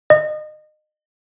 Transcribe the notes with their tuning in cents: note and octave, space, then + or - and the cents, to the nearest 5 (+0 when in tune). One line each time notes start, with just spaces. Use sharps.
D#5 -30